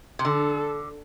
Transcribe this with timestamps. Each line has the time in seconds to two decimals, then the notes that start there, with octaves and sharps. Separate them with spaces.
0.19 C3
0.25 D3 A4